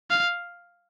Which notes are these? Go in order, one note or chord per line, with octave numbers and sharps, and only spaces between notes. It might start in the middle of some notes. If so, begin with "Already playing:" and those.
F5